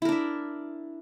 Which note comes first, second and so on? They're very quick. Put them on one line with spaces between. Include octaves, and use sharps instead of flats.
E4 A#4 D4 E5